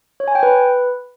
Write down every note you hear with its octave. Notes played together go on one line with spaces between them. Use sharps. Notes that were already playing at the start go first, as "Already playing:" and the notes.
C#5
G#5
G5
B4